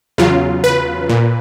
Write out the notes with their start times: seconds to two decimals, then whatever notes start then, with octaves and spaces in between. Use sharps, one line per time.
0.18 E2 C#3 F#3 F4
0.64 B4
1.09 A#2